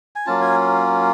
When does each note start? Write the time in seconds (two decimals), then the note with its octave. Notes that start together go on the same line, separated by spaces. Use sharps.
0.16 G#5
0.26 F#3 A#3 C#4 F4 A5
0.42 G#5